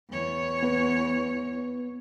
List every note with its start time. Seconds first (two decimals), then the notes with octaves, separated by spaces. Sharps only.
0.10 E2 C#5
0.63 B3 B4